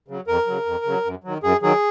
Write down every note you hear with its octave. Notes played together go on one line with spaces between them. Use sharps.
C#3 F#3
F2 A#4
C#3 F#3
F2
C#3 F#3
F#2
D#3 F#3
F#2 G#4
D#3 F#3 G#4